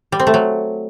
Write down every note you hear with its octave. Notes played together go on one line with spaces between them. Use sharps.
G3
C4
A3
F#3